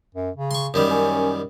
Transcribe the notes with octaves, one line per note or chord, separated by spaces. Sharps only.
F#2
C#3
C6 C#6
F#2 D#3 G3
C#4